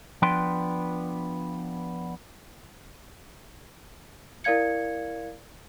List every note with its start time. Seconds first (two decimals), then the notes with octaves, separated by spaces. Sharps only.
0.22 F3 B3 D4 B4 G5 C6
4.44 E4 A#4 D5 F5 G#6 C#7